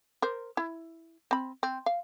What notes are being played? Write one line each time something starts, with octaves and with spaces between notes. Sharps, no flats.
A#4 C5
E4
C4 B5
C4
F5